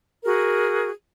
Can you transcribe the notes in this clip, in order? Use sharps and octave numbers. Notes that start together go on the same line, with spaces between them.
F#4 G#4 A#4